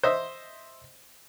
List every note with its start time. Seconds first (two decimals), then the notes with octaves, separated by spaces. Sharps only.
0.03 C5 D#5 E5